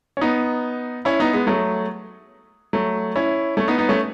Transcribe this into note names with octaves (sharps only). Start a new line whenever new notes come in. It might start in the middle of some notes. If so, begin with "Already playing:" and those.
C#4
B3 D#4
C#4 E4
B3 D#4
G#3 B3
F#3 A3
F#3 A3
C#4 E4
A3 C#4
B3 D#4
B3 D#4
A3 C#4